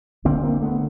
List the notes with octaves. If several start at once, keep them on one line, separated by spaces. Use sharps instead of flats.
D2 D3 A#3 C4
A#3 C4
A3 B3